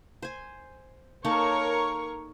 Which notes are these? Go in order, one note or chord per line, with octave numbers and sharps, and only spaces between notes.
C5 G#5
A#3 D#4 A4 A#4 C#5 C#6